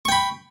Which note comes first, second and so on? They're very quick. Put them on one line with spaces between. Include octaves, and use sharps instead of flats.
C#6 G5 B5